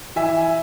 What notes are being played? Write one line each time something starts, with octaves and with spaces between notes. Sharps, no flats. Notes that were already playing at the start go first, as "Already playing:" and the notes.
E3 E5 G#5